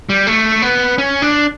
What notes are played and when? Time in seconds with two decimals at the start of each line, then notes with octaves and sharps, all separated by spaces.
0.09 G3
0.27 A3
0.62 B3
0.98 C#4
1.22 D4